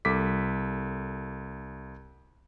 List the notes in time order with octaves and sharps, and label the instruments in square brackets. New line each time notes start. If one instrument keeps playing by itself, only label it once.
[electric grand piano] C2 A4 D6 B6